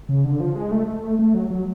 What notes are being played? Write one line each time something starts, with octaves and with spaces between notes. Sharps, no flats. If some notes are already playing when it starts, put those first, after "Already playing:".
C#3
D3
F3
G#3
A3
A3
A3
A3
F#3
F#3